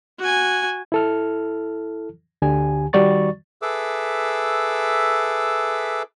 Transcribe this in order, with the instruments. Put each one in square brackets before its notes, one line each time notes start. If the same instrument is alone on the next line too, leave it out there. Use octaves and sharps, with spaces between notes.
[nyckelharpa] F#4 G#5
[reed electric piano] E4 A4 F6
D2 D3 G4 G#5
D#3 G3 F#4 D5 C#6 A6
[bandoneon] G#4 A4 B4 E5 D6 E6